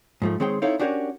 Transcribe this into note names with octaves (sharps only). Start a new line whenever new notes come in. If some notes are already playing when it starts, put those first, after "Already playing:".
G#2 F3 A3
D#3 G#3 C4 G#4 C#5 G5
C4 D#4 E4 A4 C#5 F5
C#4 D4 F#4 G4 A#4 C#5